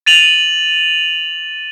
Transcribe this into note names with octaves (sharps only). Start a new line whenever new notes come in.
A6 D#7 F7 F#7